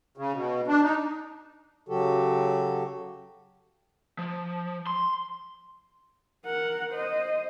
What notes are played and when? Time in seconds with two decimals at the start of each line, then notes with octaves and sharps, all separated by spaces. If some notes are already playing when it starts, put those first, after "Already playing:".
0.17 C#3
0.34 B2
0.68 D4
0.83 D#4
1.89 C#3 F#3 F#4 G4 A4
4.18 F3
4.87 C6
6.46 A#4 F#5
6.92 C5 D#5